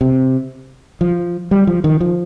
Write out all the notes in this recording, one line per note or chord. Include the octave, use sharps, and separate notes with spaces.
C3
F3
G3
F3
D#3
F3